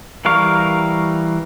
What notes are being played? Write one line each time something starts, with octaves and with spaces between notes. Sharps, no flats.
E3 G3 A#4 F5 C#6